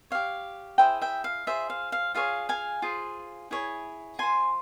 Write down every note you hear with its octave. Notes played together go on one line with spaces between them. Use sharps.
G4 C#5 F5
E4 G#4 C5 E5 G5
E5 G5
F5
F4 G#4 C5 E5
F5
F5
F4 G#4 C#5 F5
F5 G#5
F4 G#4 C5
E4 G#4 C#5
F4 C5 G#5 C6